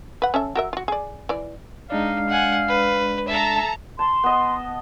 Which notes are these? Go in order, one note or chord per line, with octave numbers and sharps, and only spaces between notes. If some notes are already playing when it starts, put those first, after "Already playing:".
B4 F#5
C#4 A4 E5
F#4 A#4 E5
F4 F#4
G#4 D5
E3 D5
G#3 D4 D#4 D5 F5
F#5 G#5
B4
A4 E5 A5 A#5
A5 C6
B3 D#5